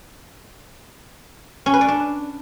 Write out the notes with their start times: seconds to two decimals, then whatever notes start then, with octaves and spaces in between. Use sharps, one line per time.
1.66 C#4
1.74 B4
1.81 D5
1.88 D4